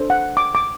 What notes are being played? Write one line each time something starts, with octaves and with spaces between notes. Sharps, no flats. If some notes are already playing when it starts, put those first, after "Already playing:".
Already playing: D4 A4 C5
F#5
D6
D6